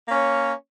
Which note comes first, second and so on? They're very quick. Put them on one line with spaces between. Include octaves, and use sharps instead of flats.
A#3 C#4 C#5